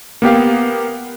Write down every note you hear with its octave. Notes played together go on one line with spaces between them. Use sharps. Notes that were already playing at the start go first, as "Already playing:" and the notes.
A#3 B3 G4 F5